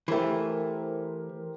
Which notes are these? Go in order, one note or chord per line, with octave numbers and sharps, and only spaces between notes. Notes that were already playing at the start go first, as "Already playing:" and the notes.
E3 A3 G4 A#4 C5